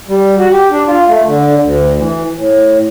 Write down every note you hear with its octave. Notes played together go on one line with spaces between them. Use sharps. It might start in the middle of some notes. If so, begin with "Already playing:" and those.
G3
F#4
G4
D4
F4
A3
D3
D2
E3
A2